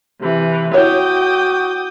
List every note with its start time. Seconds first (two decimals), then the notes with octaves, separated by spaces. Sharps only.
0.19 C3 E3
0.74 E4 F#4 C#5 G5 D6 D#6